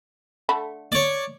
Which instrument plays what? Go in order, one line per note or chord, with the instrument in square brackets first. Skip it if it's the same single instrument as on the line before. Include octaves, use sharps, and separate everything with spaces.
[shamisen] D3 A3 B5
[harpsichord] C#5 D5